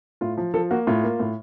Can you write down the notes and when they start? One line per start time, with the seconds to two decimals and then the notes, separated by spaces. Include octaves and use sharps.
0.21 A2 F4
0.37 F3
0.54 F3 A4
0.71 A#3 F#4
0.87 A2 F4
1.03 A#3
1.20 A2